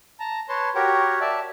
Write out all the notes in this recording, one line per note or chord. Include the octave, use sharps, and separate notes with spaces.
A5 A#5
B4 C#5 A5 C6
F#4 G4 A#4 C#5 G5
D5 E5 A5